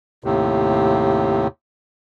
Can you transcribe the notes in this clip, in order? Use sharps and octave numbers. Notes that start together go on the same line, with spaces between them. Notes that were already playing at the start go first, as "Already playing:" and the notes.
D#2 A2 C3